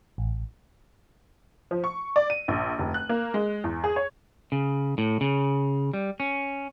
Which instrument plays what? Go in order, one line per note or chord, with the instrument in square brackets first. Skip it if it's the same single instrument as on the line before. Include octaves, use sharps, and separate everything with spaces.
[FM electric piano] A1
[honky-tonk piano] F3
C#6
D5
D#7
A#1
F1
F#6
A#3
G#3
E2
G#4
C#5
[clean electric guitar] C#3
A2
C#3
G3
C#4